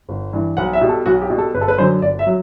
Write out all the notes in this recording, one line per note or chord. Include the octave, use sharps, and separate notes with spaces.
G1
G2 E3
B1 F#5
E5
B2 G3
A4
B1 F#4
G4
B2 G3
A4
G1 B4
A4
B4
F#2 D3 F#3 C5
G1 D5
E5
F#3